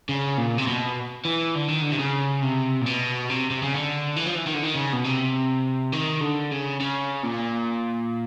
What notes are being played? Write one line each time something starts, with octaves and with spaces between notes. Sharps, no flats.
C#3
A#2
C3
B2
E3
D3
D#3
D3
C3
C#3
C3
A#2
B2
C3
C3
C#3
D3
E3
F3
E3
D#3
D3
D#3
C#3
B2
C3
D#3
D3
C#3
C#3
A#2